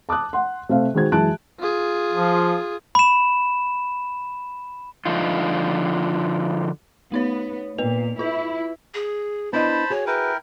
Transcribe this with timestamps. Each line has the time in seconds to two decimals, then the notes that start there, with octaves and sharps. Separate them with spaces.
0.09 A5 D6 D#6 F#6
0.33 F#5 C6
0.69 C3 A3 C5 F5
0.94 D#3 G#3 F#4 C5 G#6
1.12 F#2 E3 G#3 A5 F#6 D7
1.59 F4 G#4
2.11 F3
2.95 B5 E7
5.06 D3 F3 D#4 F4
7.12 A3 B3 D#4 C#5
7.78 A#2 B3 B4 F7
8.19 E4 F4 B4
8.94 G#4
9.53 B3 D4 E4 C5 D#5 A5 B5
9.90 F#4 G#4 C#5
10.07 E4 A#4 B4 G5